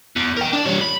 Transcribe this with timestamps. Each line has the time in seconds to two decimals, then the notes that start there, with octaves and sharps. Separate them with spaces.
0.16 E2
0.37 A#4 G5
0.53 D4 D5
0.65 G3 C#5
0.81 B5